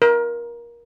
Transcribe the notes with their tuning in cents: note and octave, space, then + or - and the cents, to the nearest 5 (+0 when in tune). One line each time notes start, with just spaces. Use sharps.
A#4 +20